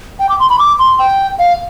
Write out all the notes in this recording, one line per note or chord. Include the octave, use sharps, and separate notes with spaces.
G5
D6
C6
B5
D6
C6
G5
F5